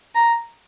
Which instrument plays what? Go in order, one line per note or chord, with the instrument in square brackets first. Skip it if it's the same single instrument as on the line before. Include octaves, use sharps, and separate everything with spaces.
[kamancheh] A#5